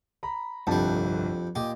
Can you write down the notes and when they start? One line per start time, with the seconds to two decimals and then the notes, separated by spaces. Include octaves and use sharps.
0.23 A#5 B5
0.67 G1 C2 F2 G3 A5
1.55 A#2 G4 D#5